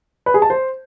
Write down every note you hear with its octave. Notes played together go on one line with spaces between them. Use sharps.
B4
G#4
A5
C5